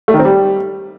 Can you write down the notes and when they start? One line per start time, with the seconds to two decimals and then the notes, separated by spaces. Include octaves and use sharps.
0.08 A3
0.14 D#3
0.19 C4
0.25 G3